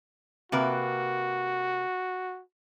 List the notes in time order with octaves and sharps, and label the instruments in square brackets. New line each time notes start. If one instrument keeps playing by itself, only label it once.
[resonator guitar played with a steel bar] C3 A#3 B4 [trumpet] F#4